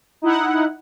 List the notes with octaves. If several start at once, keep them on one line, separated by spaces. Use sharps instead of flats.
D#4 E4 F#5